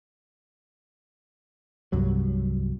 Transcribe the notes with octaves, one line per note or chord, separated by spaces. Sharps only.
C2 G2 F#3